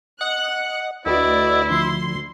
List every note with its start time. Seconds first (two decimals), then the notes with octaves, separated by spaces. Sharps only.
0.21 D#5 F#5 F#6
1.06 D2 E4 F#4 B4 D5 D#5
1.70 D3 F3 C6